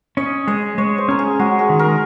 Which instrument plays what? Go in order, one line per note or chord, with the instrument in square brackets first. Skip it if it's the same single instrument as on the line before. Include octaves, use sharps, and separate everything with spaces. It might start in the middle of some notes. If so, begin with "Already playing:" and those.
[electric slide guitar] C#4 [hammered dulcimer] D#5
[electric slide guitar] G#3 [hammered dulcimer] D#5
[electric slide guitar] G#3 [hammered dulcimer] C#5
[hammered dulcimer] C5
[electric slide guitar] C#4 [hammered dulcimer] A#4
[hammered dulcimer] G#4
[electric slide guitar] G#3 [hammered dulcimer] F#4
[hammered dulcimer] G#4
[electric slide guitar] D#3
[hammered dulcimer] A#4